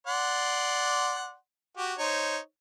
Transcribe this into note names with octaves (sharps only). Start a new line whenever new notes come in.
D5 F#5 C6
F#4 G4
D#4 C5 C#5